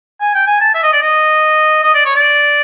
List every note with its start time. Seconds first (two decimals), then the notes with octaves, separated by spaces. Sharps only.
0.21 G#5
0.35 G5
0.47 G#5
0.61 A5
0.74 E5
0.83 D#5
0.93 D5
1.02 D#5
1.84 D#5
1.94 D5
2.05 C#5
2.16 D5